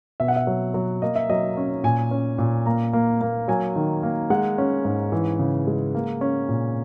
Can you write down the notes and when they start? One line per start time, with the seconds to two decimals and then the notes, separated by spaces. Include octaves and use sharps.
0.20 B2 E5
0.28 F#5
0.36 E5
0.47 F#3
0.74 F#3
1.02 A#3 D#5
1.15 E5
1.29 F#3 D#5
1.57 C#4
1.84 A#2 G#5
2.11 C#4
2.38 A#2
2.66 A#3 A#5
2.93 A#3
3.21 A#3
3.48 F#3 G#5
3.76 D#3
4.03 A#3
4.30 G#3 F#5
4.58 C#4
4.85 G#2
5.12 E3
5.39 C#3
5.67 G#3
5.95 A#3
6.21 C#4
6.49 A#2